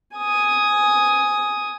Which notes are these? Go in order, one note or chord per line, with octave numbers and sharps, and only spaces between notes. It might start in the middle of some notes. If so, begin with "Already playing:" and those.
G#5 D#6